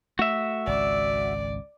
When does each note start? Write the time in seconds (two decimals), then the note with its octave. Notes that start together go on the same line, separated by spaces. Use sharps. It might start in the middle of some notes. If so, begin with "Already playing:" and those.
0.19 A3 F#4 E5
0.67 G#1 C#2 D5